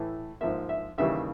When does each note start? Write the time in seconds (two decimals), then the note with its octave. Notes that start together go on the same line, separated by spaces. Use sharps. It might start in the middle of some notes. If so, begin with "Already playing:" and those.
Already playing: A2 E3 A3
0.41 G#2 F3 A#3 E5
0.69 E5
0.98 D#2 C#3 E3 G3 A#3 E5